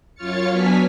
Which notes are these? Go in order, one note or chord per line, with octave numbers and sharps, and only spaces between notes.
F#2 F4 C#5 F6 A6 C#7
F#3 B3 D4 G#5 F6 B6